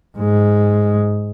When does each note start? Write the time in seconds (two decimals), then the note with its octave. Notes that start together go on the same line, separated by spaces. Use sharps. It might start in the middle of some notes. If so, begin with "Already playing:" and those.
0.18 G#2 G#3